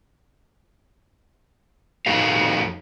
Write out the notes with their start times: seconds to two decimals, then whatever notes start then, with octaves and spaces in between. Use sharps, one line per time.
2.06 F2 D#4 F#4 A4 F5